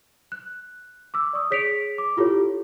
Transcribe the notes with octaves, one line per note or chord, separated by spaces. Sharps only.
F#6
D6 E6
D5 C#6 D#6
G#4 C#5 B6 C#7 D7 F7
D6
E4 F4 G4 A4 C#5